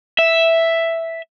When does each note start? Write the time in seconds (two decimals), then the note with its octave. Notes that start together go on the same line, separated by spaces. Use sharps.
0.19 E5